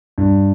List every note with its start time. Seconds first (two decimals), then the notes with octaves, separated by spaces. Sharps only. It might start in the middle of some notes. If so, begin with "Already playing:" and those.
0.18 G2